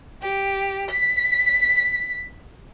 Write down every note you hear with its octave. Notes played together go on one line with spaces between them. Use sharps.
G4
B6